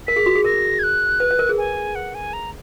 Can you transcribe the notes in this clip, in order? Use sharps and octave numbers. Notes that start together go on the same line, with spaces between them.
A#4 B6
G#4
F#4
G#4
A#4 A#6
G#6
F#6
B4
B4
A#4
G#4
G#5
F#5
G#5
A#5